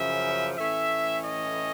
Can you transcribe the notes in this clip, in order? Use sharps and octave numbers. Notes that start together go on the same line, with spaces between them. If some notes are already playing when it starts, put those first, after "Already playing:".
Already playing: F#2 C#3 F3 E5
A2 E3 A3 C#4 E5
D#5